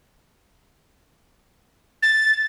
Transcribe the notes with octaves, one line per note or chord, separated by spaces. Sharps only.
A6